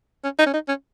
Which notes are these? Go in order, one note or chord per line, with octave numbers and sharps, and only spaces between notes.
C#4
D#4
C#4
D#4
C#4